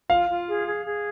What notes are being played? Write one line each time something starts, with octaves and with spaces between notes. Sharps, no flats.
F4 F5
F4
G#4
G#4
G#4